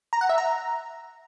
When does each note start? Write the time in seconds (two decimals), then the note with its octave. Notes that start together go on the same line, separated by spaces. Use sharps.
0.13 A#5
0.21 F#5
0.29 E5
0.38 A#5